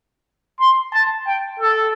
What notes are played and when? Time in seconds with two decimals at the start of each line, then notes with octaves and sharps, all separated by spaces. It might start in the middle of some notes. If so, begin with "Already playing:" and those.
0.60 C6
0.93 A5
1.26 G5
1.59 A4